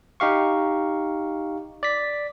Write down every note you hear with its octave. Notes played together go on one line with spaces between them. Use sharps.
D#4 G4 F5 C#6
D5 B6